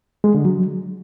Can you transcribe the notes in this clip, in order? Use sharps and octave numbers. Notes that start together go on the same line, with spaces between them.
G#3
D3
F#3